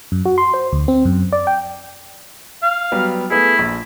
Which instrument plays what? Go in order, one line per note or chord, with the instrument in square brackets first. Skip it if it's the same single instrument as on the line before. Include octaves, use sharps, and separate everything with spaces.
[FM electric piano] F#2
F#4
C6
C5
D2
C4
F#2
D5
G5
[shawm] F5
[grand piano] F#3 G3 B3
[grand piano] A3 B3 G#4 [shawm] E4
[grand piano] A#1